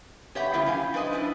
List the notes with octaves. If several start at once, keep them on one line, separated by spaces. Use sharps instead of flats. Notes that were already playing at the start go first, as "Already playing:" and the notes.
G4 B4 C#5 E5 F#5 G5
C#3 F#3 A#3 E4 F4 G4
F#2 F5 G5 G#5
D4 E4 B4 C5 D#5
F#2 D4 E4